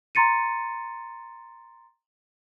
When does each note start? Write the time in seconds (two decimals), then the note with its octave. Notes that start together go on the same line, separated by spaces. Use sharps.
0.15 A#5 C6 A6 C#7 D#7